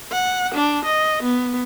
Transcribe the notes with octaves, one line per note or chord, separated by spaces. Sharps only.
F#5
D4
D#5
B3